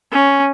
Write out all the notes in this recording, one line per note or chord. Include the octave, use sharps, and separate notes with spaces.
C#4